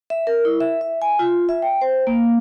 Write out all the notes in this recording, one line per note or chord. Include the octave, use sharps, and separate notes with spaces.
E5
A#4
E4
E5
E5
G#5
F4
E5
G5
C5
A#3